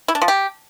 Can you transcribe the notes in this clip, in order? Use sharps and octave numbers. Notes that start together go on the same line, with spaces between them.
E4
D4
F3
G4